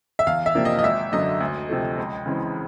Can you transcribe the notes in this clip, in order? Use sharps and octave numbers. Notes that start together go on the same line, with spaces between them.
E5
E2 F5
E5
C3 F3 A#3 D4
D#5
D#5
G#1 E5
F#2 D3 F#3 D#5
D2
C3 F3 A3
C#2
C#3 E3 G#3 C4